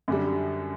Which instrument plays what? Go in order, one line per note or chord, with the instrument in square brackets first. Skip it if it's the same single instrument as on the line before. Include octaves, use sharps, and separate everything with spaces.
[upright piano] F#2 D3 G3